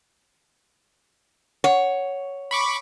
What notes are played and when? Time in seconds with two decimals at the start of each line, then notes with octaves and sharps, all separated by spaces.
1.64 C#5 F#5
2.51 B5 C#6 D6